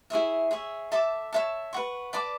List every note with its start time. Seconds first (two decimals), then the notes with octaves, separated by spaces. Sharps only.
0.10 E4 G#4 C#5 E5
0.51 G#4 C#5 E5
0.92 A4 E5 A5 D6
1.33 C#5 E5 A5
1.73 B4 F#5 C#6
2.13 B4 D5 A5 D6